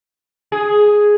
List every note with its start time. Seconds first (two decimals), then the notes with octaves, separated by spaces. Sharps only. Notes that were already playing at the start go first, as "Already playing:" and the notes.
0.52 G#4